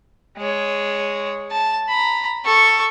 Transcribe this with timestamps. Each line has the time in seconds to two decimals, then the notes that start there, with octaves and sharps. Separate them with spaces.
0.37 G#3 C#5
1.51 A5
1.89 A#5 B5
2.45 A4 C#6